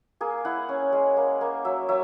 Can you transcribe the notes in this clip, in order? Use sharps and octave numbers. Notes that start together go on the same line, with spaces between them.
A#3 G#4
E4 F#5
C#4
G#3
A#3
A#3
F#3 E5
F#3 E5